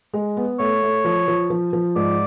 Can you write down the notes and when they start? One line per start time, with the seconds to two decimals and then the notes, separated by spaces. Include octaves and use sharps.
0.13 G#3
0.37 B3
0.59 A3 C#5
0.83 A3
1.05 F3
1.28 F3
1.50 F3
1.73 F3
1.96 G#2 D5